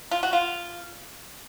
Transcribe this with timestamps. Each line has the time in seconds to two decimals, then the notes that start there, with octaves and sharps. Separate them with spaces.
0.11 F4
0.23 F#4
0.33 F4